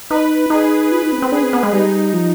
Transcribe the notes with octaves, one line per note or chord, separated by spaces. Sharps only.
D#4 B4
D#4 G#4
F4 B4
D#4
C4
C4
D4 G#4
C4
B3
G#3
G3 D#4
F3